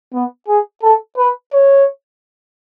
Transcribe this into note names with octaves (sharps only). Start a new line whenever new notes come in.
B3
G#4
A4
B4
C#5